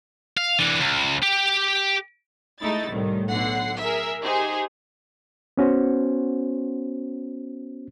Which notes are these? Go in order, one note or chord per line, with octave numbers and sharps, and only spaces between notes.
F5
E3 D4
C#2
G4
G#3 A3 D#4 E4 A6
C2 A2 D#3
B1 D3 F#5 C7
G#4 A#4 E5
D#4 G4 G#4 C5
B3 C#4 F#4 C5